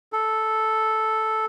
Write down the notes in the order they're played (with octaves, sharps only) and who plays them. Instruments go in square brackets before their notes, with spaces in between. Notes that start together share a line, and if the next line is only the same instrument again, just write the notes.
[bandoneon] A4